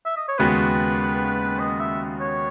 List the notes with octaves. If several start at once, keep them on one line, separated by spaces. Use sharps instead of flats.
E5
D#5
C#5
D#2 C#3 G#3 B3 F#4 B4
D#5
E5
C#5